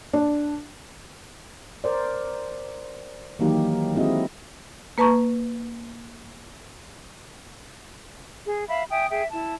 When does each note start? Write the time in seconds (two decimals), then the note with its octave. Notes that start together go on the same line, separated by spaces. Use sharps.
0.13 D4
1.84 A#4 C5 D5
3.39 D#3 E3 F#3 A#3 D#4 G4
3.95 G#3 C4 E4 F#4 D#5
4.98 A#3 B4 A5 A#5 C#6
8.45 G#4
8.67 E5 F5 B5
8.90 E5 G5 G#5 D#6
9.10 G#4 E5 G5
9.30 E4 A5